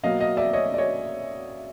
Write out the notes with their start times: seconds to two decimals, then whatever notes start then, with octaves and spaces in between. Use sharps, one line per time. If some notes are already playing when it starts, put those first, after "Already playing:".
0.03 B2 F#3 A#3 D#5 F5
0.20 D#5 F5
0.37 D5 E5
0.53 C#5 D#5
0.74 D5
0.78 C#5 D#5